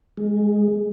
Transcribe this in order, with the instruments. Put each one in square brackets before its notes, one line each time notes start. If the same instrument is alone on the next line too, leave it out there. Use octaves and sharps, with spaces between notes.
[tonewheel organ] G#3